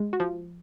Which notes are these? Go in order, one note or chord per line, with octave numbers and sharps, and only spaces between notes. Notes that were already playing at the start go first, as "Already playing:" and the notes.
Already playing: G#3
F#4
F3